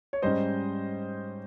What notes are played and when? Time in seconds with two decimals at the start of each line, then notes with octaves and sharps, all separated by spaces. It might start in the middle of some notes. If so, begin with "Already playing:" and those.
0.13 C#5
0.22 G#2 G3 C#4 C5 D#5